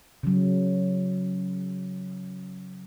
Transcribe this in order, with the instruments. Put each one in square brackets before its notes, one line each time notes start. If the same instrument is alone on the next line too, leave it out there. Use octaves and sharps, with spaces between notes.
[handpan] C#3 F#3